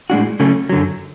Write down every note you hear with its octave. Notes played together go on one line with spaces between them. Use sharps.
A2 G#3 D4 F#4
C#3 F#3 A3 C#4
F#2 D3 F#3